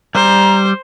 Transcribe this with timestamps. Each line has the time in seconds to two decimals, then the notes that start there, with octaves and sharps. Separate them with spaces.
0.15 G3 C5 A#5